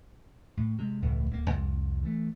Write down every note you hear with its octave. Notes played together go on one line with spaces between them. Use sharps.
A2
C3 G#3
E1 C#2 A2 A3
D1 G#3 A#3
C2 F2
E3 A3